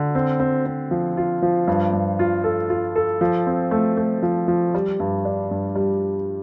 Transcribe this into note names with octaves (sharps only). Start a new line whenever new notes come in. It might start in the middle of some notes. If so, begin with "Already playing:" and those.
Already playing: D3
C4
C4
C4
F3
F4
F3
G2
G2
F4
A4
F4
A4
F3
C4
A3
A3
F3
F3
G3
G2
D4
G2
G3